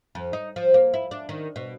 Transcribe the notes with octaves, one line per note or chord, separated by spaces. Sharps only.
F2
D#4
F3
A#3
E4
D4
D#3
B2